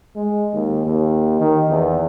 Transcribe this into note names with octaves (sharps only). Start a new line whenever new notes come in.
G#3
D#2
D#2
D#3
E2